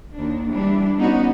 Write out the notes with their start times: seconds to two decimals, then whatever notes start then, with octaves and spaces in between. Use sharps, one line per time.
0.14 D#2 D4
0.50 E3 G3 D4
0.98 B3 C#4 D#4 F#4